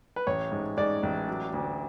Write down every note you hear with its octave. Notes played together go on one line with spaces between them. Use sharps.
B4
A1 C#5
G#2
G#2 D5
A1
F#3
D2